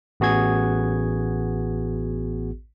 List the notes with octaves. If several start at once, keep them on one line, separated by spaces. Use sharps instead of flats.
A1 B3 F#4 G#4 G#6